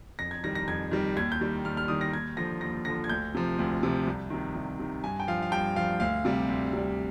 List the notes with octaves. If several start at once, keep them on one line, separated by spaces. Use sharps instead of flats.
F2 A#6
G#6
D#3 G3 A#6
A#6
F2 G#6
D#3 G3
D#2 G#6
G6
D#3 G3
D#2 F6
F6
D#3 G3 D#6
A#6
D#2 G#6
D3 F3 A#6
D#2 A#6
D3 F3 A#6
G#6
D2 G6
C3 F3
D2
C3 F3
C2
C3 D#3
C2
C3 D#3
G2 G#5
G5
F3 F5
F5
G2 G5
F3 F5
D2 F5
C3 G3
D2
C3 G3